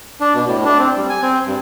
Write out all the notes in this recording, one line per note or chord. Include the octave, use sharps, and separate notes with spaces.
D4
B2
A2
D4
C4
G3
G#5
C4
G2